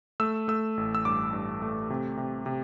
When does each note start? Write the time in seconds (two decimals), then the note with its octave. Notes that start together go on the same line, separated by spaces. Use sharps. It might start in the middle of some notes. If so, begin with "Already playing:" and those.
0.20 A3 E6
0.48 A3 E6
0.77 A1
0.95 E6
1.05 G2 D6
1.33 G2
1.62 A3
1.90 C3
2.17 C3
2.46 C3